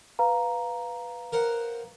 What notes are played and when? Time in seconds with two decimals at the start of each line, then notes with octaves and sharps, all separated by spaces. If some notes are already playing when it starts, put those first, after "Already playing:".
0.19 B4 F5 A#5
1.33 A#4 C5 F#5